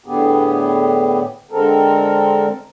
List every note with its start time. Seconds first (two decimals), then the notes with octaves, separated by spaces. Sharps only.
0.06 A2 D3 B3 G4 G#4
1.51 D3 G#3 C4 A4 A#4